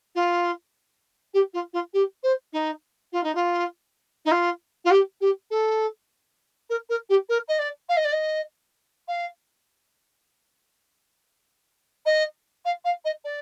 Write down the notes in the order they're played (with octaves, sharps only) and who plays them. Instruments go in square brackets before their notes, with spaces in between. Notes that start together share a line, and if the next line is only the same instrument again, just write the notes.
[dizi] F4
G4
F4
F4
G4
C5
D#4
F4
D#4
F4
D#4
F4
F4
G4
G4
A4
A#4
A#4
G4
A#4
D#5
D5
F5
D#5
D5
D#5
F5
D#5
F5
F5
D#5
D5